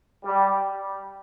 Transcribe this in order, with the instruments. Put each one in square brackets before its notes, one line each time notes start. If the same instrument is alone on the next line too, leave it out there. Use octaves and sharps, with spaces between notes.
[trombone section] G3